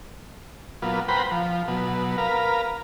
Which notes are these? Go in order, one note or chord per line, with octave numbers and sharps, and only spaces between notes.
A#2 F#3 B3 F4
B4 C5 F#5 G5 A#5 B5
F3
B2 F#3
A#4 B4 F5